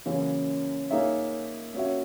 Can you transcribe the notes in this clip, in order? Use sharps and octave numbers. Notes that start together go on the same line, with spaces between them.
F#2 C#3 E3 A#3 C#4
A#3 D#4 G#4 C#5 E5
A#3 C#4 F#4 C#5 E5